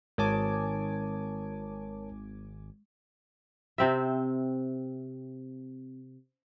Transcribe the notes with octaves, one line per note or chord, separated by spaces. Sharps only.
G#1 G#3 A#4 C#5 G#5 A5 D6
C3 C4 E5